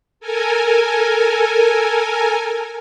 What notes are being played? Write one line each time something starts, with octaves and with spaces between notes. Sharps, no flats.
A4 A#4 G#5